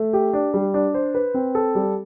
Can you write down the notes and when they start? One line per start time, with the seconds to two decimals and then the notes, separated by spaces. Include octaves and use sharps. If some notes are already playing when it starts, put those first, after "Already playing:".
Already playing: A3
0.13 G4
0.33 D4
0.54 G3
0.74 D4
0.94 C5
1.15 B4
1.34 C4
1.55 A4
1.75 G3